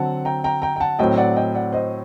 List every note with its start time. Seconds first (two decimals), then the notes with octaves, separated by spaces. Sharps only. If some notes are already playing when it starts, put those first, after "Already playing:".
Already playing: D3 F#3 C4 F#5 A5
0.25 G5 A#5
0.44 G5 A#5
0.62 G5 A#5
0.76 G5
0.80 F#5 A5
0.99 A2 F#3 C4 D#5 G5
1.17 D5 F#5
1.36 D#5 G5
1.54 D5 F#5
1.73 C5 D#5